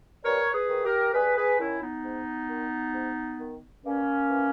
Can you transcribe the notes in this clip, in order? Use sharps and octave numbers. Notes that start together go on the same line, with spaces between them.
G2 A#4 C#5
G#4 B4
D#3
G4 A#4
G2 G#4 B4
G#4 B4
D#3 C#4 E4
B3 D#4
G#2
D#3
G#2
D#3
G2 A#3 C#4
E3